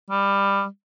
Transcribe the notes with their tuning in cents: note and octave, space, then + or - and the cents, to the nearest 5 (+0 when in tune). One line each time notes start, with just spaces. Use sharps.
G3 +20